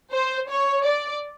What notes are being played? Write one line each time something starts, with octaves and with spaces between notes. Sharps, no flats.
C5
C#5
D5